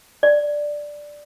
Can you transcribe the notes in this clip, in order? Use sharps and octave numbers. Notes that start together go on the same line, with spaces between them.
D5